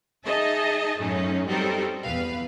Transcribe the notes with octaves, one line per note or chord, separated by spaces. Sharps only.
D#4 G#4 D#5 E5 A5
F#2 A2 A3 C#4 D#4
F#3 G3 C4 D#4 A4 A#4
E2 B4 F5